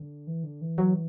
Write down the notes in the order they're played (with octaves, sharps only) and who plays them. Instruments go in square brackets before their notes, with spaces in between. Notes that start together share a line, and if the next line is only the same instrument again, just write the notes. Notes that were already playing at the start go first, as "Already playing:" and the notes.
Already playing: [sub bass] D3
E3
D3
E3
[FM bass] F#3